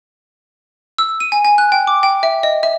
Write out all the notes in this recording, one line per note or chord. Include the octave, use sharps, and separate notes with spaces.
E6
D#7
G#5
G#5
F#6
G5
D6
G5
E5
D#5
E5